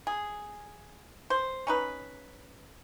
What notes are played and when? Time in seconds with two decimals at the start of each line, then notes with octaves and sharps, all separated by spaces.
0.07 G#4
1.30 C5
1.67 C#4 D#4 B4